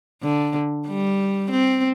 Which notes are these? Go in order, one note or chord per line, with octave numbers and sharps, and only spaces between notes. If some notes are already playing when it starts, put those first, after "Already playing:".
D3
G3
C4